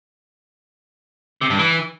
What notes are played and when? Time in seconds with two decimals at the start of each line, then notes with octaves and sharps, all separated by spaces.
1.41 C3
1.50 G2
1.59 E3